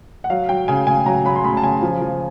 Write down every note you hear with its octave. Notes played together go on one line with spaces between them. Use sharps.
F#5
F#3 F5
F#3 G5
C#3 G#5
C#3 G#5
F#3 A#5
F#3 B5
C6
C#3 B5
A5
C#3 G#5
F3
F3